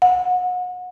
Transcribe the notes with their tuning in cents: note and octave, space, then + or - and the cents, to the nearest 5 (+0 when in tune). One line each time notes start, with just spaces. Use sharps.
F#5 -30